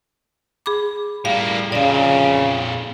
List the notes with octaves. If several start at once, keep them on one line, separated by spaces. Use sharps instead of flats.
G#4 B5 D6
A2 G3 A#3 F5
F2 A#2 C#3 D5 F5